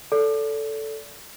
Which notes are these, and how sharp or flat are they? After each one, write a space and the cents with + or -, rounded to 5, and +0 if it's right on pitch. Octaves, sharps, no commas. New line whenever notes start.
A4 +0 D5 -35